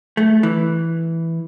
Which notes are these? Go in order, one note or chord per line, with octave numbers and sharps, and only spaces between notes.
A3
E3